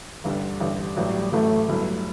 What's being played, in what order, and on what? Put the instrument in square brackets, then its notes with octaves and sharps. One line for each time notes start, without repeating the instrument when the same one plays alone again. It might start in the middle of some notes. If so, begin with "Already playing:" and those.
[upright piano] A1 G2 D3 G3
A1 G2 D3 G3
[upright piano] A1 A2 F#3 [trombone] G3
[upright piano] A1 A2 F#3 [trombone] A3
[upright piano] G1 G2 F#3 A3 E4